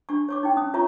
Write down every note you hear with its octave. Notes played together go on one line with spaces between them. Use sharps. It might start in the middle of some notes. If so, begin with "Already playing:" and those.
D4 C#6
C#5 C#6 D6
D#4 G5
C#4 D#6
F4 C#5 E5 A#5 C#6